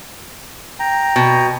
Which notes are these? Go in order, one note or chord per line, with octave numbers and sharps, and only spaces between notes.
G5 A#5
B2